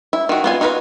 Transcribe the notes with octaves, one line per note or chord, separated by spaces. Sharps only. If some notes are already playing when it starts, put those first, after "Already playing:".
E4
D#3 F#4
B3 F4 G#5
D#4 F4 F#4 A#4 B4